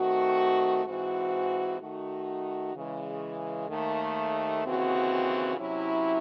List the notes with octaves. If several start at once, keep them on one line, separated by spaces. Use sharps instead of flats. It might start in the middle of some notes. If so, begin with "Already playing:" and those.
Already playing: D#3 A3 C4 F#4
G#2 E3 C4 F#4
D#3 A3 D#4 F#4
C#3 E3 G#3
D#2 D#3 A3
D#2 C#3 E3 C4 F#4
C3 F#3 C#4 E4